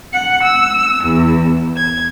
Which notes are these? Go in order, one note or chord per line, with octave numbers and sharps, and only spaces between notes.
F#5
E6
E2
G#6